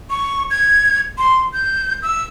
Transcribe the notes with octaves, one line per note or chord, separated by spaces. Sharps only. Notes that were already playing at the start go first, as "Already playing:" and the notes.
C#6
G#6
C6
G6
E6